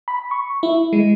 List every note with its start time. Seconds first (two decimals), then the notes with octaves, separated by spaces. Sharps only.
0.08 B5
0.31 C#6
0.63 E4
0.93 G#3